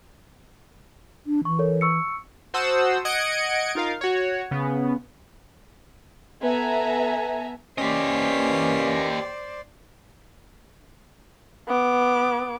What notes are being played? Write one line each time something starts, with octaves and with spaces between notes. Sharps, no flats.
D4
E3 C#6
A4 A#4 C#5
C#6 E6 C#7
F#4 C5 F#5 A5 D#6 E6
D#5 F#5 G#6 C#7 D7
D#4 F4 A#4 F5
F#4 C#5
C#3 B3
B3 A4 E5 G#5 A#5
E3 A#3 C#4 G4 B4 C5 D5 D#5
B3 D6